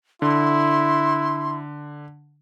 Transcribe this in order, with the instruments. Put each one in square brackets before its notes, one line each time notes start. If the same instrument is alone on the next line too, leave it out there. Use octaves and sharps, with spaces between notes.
[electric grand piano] D3 [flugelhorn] E4 [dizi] C6